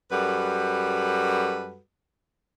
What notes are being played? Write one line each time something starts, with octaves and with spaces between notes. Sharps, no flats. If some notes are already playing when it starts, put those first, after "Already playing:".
F#2 G3 F#4 A4 B4